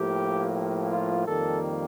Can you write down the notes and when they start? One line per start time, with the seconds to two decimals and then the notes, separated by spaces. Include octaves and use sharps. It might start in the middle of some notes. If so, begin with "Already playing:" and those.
Already playing: A2 F3 A#3 G4
0.55 G4
0.91 F4
1.27 F2 D#3 G3 A#3 A4